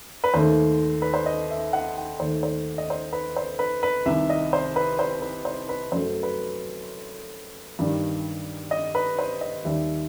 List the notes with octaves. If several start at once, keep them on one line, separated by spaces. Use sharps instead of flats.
B4
D#2 D#3 A3 C5
B4
C5
D#5
E5
F#5
G5
D#2 D#3 A3 C5
C5
D#5
C5
B4
C5
B4
B4
C2 C3 D#3 E5
D#5
C5
B4
C5
B4
C5
B4
F#2 F#3 A3 C5
B4
G2 D#3 G3
D#5
B4
C5
D#5
D#2 D#3 G3 E5